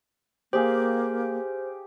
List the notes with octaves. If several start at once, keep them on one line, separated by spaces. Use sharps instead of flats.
A#3 G4 G#4 C5 F5